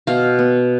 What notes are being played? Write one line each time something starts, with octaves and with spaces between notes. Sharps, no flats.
B2 F5
B3